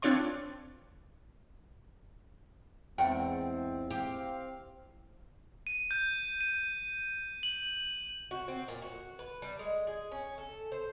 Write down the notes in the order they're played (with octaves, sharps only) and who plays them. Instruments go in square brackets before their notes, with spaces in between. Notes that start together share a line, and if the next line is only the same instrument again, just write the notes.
[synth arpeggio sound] C4 D4 F4 C#5 D5 C6
[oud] E2 [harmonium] G#2 C4 [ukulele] F#5 G5
[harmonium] C4 F5 [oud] G4
[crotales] D#7
G6
D#7
F#7
[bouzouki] F#4
C4
A#2
F#4
B4
G3
G#3
G#4
C#4
A4
C5